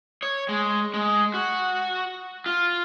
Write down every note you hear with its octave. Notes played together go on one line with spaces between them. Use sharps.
C#5
G#3
G#3
F#4
F4